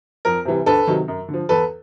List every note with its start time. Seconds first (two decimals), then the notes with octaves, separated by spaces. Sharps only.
0.25 F2 A#4
0.45 C3 E3 G3
0.66 D2 A4 B4
0.87 C3 D#3 F#3
1.08 F#2
1.28 D3
1.34 F3
1.49 E2 A4 B4